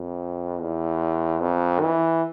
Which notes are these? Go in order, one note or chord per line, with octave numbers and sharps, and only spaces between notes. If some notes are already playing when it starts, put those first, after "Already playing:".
Already playing: F2
E2
F2
E3